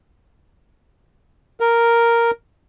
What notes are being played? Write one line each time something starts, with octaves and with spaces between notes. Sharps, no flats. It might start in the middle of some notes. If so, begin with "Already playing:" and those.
A#4